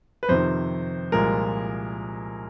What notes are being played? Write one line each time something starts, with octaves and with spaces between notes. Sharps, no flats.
B4
F2 C3 D#3 C5
C2 A#2 F3 G#3 A#4